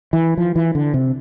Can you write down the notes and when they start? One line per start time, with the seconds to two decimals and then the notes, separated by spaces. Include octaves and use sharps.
0.13 E3
0.38 F3
0.56 E3
0.75 D3
0.94 C3